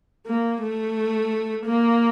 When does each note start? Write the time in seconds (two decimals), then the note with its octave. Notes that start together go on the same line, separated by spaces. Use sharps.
0.26 A#3
0.61 A3
1.66 A#3